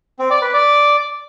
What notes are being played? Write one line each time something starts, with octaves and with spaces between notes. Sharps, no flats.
C4
D5
B4
D5